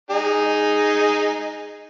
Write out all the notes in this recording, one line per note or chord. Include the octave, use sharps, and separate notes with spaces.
D#4 G#4